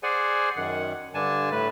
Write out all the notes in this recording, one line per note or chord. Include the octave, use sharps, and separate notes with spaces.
G#4 C5 D5 F#5 G#5
F#2 D#3 F#5
G2 D3 D4 G#5 A5
A2 A3 B4